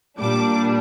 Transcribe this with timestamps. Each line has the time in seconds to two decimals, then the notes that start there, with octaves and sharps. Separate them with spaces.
0.19 A#2 G3 D4 D6